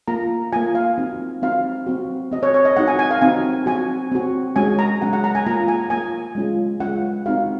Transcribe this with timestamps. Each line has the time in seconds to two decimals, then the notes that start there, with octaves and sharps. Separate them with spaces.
0.08 A#3 F4 A#5
0.53 A#3 F4 G#5
0.75 F5
0.98 C4 D#4 F#4
1.42 C4 D#4 F#4 F5
1.87 C4 F#4
2.32 C4 F#4 D#5
2.43 C#5
2.54 C#5
2.65 D#5
2.77 C4 D#4 F#4 F#5
2.88 G#5
2.99 G#5
3.11 F5
3.21 C4 D#4 F#4 G#5
3.66 C4 F#4 G#5
4.12 C4 F#4
4.56 G#3 C#4 F#4 G#5
4.79 A#5
5.01 G#3 C#4 F#4 F#5
5.13 F#5
5.24 A#5
5.35 G#5
5.46 A#3 F4 A#5
5.68 G#5
5.90 A#3 F4 G#5
6.35 G#3 C#4 F4
6.80 G#3 C#4 F4 F#5
7.26 C4 D#4 F#4 F5